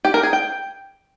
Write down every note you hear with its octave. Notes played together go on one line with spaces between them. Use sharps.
G4
A#4
G#4
G5